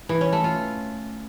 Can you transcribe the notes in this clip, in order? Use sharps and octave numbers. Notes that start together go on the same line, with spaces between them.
E3
C#4
A3
F4